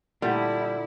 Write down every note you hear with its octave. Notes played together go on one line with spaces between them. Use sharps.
A#2 D3 G3 A3 E4